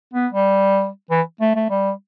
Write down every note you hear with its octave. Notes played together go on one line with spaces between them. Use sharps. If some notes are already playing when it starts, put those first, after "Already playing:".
B3
G3
E3
A3
A3
G3